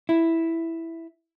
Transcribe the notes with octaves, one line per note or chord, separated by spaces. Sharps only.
E4